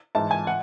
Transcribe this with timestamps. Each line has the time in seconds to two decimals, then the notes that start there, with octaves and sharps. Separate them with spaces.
0.15 G#2 E3 A5
0.31 G#5
0.47 F#5